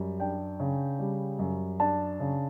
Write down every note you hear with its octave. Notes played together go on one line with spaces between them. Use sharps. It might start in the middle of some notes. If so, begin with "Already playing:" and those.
Already playing: F#2 G3
D4 G5
C#3
G3
F#2
D4 A5
C#3